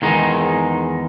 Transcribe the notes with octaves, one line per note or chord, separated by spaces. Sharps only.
E2 D#3 G#3 D#4